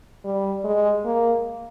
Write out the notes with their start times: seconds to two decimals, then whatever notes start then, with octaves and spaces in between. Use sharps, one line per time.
0.24 G3
0.65 G#3
1.05 A#3